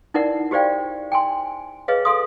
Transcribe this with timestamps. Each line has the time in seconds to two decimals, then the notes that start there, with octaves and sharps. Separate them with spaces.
0.14 D#4 E4 A#4 D5 F#5
0.51 F#4 G4 C5 D5 F5 G5
1.12 G5 G#5 C6
1.88 G#4 B4 C#5 D#5 F5
2.05 A4 F5 C6 D#6